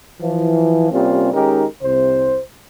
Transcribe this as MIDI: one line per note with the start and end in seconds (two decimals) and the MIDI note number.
0.20 0.88 52
0.20 0.88 53
0.91 1.31 48
0.91 1.31 55
0.91 1.31 58
0.91 1.31 60
0.91 1.31 61
0.91 1.31 65
1.33 1.64 51
1.33 1.64 56
1.33 1.64 61
1.33 1.64 63
1.33 1.64 67
1.33 1.64 70
1.82 2.40 36
1.82 2.40 48
1.82 2.40 72